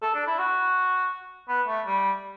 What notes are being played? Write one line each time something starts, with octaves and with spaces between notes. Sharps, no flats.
A4
D4
E4
F#4
B3
A3
G3